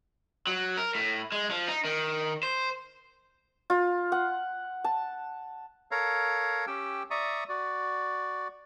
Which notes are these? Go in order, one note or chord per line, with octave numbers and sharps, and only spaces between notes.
F#3
A#4
A2
G#3
F3
D#4
D#3
C5
F4
F#5
A5
A4 A#4 C#5 F5 A#5
C#4 G4 G5 E6
D5 E5 A#5 C#6 D#6
F#4 D5